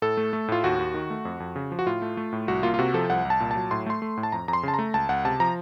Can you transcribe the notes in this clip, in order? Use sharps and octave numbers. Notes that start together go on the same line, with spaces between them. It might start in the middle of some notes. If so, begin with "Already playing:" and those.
A2 A4
A3
A3
A2 F4
D#2 F#4
D#2
D#3
A3
F2
F2
C#3
F3
F#4
A2 F4
A3
A3
A2
C2 F#4
A#3 F4
F4
C3 F#4
F3 A4
C2 F#5
C2
A5
A#2
A5
F#3
A2 C6
A3 C6
A3
A2
A5
F2 A#5
F2 A#5
C6
C#3 A5
A3 A#5
C#2 A5
C#2 F#5
C3 A5
F3 A#5